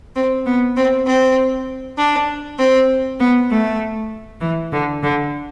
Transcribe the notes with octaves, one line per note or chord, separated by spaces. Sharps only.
C4
B3
C4
C4
D4
C4
B3
A3
E3
D3
D3